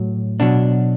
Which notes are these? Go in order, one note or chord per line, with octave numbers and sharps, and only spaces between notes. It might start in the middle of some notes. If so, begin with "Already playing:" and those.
Already playing: A2 F#3
B2 F#3 D4